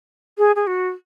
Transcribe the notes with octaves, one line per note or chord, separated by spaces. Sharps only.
G#4
G#4
F#4